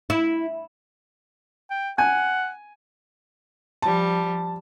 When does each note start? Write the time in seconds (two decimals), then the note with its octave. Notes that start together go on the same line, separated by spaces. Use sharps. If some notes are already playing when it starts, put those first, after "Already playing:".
0.10 E4
1.70 G5
1.98 F#5 G#5
3.82 F3 G3 A5